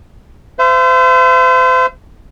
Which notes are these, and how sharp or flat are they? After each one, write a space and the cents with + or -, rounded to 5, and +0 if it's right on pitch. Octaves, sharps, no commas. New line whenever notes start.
C5 -35 E5 +35